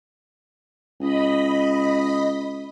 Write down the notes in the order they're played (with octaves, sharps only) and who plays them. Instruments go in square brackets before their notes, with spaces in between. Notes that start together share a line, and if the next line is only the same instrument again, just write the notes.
[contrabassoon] C#2 [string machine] D#5 B5